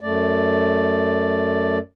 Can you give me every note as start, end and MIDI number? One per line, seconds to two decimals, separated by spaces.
0.01 1.78 42
0.01 1.78 57
0.01 1.78 74